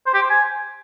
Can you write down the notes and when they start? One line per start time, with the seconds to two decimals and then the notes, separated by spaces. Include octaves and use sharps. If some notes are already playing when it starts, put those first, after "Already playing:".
0.06 C5
0.14 G4
0.22 C5
0.30 G#5